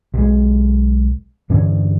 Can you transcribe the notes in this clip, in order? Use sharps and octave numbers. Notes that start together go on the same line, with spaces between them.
B1 G#3
G2 D3 E3 C#4